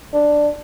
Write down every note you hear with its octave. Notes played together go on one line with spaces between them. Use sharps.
D4